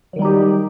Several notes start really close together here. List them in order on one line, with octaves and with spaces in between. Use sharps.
F#3 D#3 G3 D#4 G4